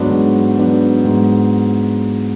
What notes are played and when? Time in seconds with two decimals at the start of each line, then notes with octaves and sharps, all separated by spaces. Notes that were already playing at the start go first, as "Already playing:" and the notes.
Already playing: G#2 F#3 B3 D4
0.11 G#2
0.58 F#3 B3 D4
1.05 G#2